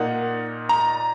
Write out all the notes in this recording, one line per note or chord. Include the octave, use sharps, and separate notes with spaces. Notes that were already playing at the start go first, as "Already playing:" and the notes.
Already playing: A#2 A#3 D#4 F#5
A#5